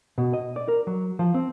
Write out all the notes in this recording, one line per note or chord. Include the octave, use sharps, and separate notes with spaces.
B2
D#5
D5
A#4
F#3
F3
C4